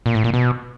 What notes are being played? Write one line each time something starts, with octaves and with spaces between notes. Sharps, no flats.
A#2
A2
A#2
B2